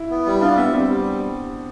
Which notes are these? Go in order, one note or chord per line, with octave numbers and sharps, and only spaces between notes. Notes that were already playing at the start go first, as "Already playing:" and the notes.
Already playing: E4
B3
G3
D4 F4
B3 E5
G3 C4
G3